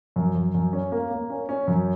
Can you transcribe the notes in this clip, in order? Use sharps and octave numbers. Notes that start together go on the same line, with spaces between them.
F#2
F#2
F#2
C#4
A#3
A#3
C#4
C#4
F#2